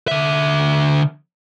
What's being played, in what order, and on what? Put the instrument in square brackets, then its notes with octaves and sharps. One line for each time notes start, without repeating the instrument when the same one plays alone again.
[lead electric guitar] D3 E5